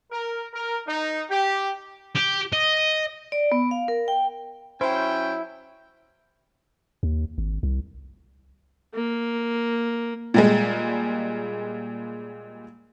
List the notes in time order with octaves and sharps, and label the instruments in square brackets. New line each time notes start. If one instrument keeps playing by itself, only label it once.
[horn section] A#4
A#4
D#4
G4
[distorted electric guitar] G4
D#5
[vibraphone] D5
B3
F5
A#4
G5
[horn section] F#3 C#4 G5 [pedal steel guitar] E4 [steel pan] C5
[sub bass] D#2
G#1
C2
[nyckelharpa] A#3
[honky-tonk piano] A#2 G3 G#3